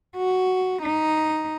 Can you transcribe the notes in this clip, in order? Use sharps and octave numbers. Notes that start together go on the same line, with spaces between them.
F#4
D#4